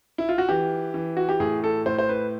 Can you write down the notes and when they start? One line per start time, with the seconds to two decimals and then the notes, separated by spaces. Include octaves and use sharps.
0.18 E4
0.29 F4
0.38 F#4
0.49 E3 G4
0.94 E3
1.17 F#4
1.29 G4
1.40 A2 G#4
1.64 A4
1.86 A2 C5
1.98 C5
2.09 B4